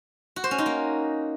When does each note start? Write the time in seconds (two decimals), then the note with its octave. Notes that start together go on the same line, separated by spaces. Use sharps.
0.36 F#4
0.44 C5
0.51 C#4
0.58 D#4
0.66 A#3